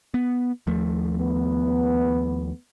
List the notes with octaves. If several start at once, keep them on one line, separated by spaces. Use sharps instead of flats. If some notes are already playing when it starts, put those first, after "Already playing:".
B3
D#2 F3 A3
B3